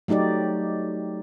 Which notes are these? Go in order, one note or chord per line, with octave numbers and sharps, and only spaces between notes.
F#3 A3 D#4 G4 D5